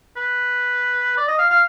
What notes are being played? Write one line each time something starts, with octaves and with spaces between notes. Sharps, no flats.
B4
D5
D#5
F5
F5